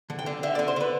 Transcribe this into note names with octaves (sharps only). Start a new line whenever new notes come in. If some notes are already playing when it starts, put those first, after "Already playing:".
D3
G5
D3
D3 E5
D3 D5
C5
D3 B4